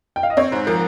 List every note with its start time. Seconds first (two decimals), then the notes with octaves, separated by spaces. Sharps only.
0.16 G5
0.23 F5
0.30 D#5
0.37 C4 C#5
0.51 G#2 C5
0.67 F3 A#4